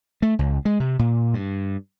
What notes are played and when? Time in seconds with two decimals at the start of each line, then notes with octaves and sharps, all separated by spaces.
0.22 A3
0.39 C#2
0.65 G#3
0.80 C3
0.99 A#2
1.34 G2